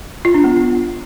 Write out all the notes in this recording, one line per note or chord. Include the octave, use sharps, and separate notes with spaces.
F4
D4
B3